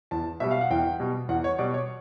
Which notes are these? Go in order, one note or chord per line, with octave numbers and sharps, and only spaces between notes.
E2 A5
B2 G3 E5
F5
F#5
E2 G5
B2 G3
E2 F#5
C#5
B2 G3 D5
C#5